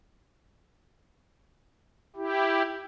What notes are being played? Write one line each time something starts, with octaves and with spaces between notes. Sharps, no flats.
E4 G4